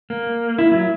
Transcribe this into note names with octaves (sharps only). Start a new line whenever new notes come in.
A#3
E4
F#3